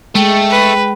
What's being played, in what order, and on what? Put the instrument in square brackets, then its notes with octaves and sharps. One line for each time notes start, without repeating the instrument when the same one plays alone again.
[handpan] G#3 [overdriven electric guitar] A3 [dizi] G5
[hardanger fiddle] B4